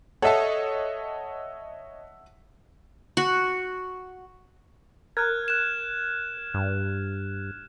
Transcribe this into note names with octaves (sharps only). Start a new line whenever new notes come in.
A4 C#5 D#5 E5 F#5 A5
F#4
A#4 F6 F#6 G#6
F#6 E7
G2